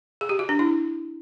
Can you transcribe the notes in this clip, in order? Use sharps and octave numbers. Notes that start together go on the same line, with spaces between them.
G#4
G4
F#4
D4
E4